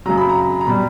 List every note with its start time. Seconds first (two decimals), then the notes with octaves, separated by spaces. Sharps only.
0.06 F#2 C#3 F#3 A#5
0.18 B5
0.29 A#5
0.61 A#5
0.67 B2 G3 B5